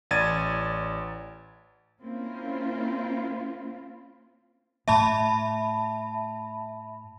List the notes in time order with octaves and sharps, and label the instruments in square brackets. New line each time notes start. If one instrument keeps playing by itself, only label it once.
[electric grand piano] A1 D5 G#6 A6 D#7
[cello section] A#3 C4 C#4 E4 F4
[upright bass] A2 [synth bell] E5 A5 B5